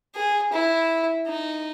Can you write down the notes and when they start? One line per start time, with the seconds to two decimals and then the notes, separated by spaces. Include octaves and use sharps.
0.15 G#4
0.52 E4
1.27 D#4